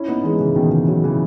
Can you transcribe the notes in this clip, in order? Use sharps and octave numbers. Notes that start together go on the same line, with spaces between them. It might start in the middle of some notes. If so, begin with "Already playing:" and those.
Already playing: C#4 E4
B3 D#4
E3 G#3
C#3 E3
B2 D#3
C#3 E3
D#3 F#3
C#3 E3